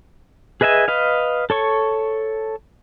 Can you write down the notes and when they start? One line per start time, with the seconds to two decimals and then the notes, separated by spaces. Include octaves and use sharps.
0.61 G#4 B4 D#5 E5 G#5
0.88 B4 D#5 F5
1.50 A4 C#5 C#6